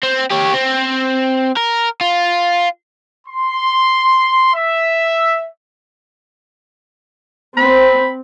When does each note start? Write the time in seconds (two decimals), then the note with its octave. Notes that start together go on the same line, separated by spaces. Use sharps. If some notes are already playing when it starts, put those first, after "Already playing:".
0.03 C4
0.30 G4 C#5
0.53 C4
1.56 A#4
2.01 F4
3.26 C6
4.54 E5
7.57 C4 B5